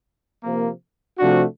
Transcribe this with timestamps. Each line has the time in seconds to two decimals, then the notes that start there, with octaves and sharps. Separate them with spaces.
0.43 C3 F3 A#3
1.18 C3 F3 A3 D4 F#4